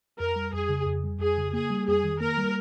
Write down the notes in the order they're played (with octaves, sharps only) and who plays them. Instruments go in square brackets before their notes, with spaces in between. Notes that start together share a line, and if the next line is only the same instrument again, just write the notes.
[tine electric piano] F2 [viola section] A#4
[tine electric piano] G3
[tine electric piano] F2 [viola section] G#4
[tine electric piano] C#3
F2
G3
[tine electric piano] F2 [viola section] G#4
[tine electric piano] C#3
[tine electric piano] A#3 [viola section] G#4
[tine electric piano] G3
[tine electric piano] F2 [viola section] G#4
[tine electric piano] D#3
[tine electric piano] A#3 [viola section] A#4
[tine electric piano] G3